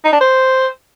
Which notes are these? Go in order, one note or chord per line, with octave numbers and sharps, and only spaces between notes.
D#4
D4
C5